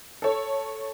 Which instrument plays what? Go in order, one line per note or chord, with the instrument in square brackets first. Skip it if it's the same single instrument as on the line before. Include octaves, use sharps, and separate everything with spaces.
[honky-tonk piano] A4 C#5